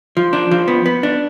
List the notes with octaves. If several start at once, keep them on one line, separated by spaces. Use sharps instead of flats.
F3
D4
F3
B3
B3
D4